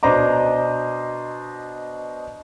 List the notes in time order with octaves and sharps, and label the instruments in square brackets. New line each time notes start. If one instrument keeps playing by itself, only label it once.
[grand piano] B2 D4 C5 D#5 A#5 D6